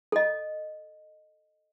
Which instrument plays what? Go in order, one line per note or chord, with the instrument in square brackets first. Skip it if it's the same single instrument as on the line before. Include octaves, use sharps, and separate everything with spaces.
[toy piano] A4 D#5